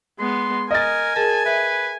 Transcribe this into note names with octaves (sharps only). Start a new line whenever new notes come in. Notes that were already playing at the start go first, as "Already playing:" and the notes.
G#3 B3 C6
A#4 D#5 G#5 A6
G#4 A#4 A5
B4 E5